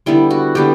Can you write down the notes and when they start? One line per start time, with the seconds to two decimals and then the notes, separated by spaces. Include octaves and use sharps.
0.06 D3 G3 B3 E4
0.31 F#4
0.55 D3 G3 B3 G4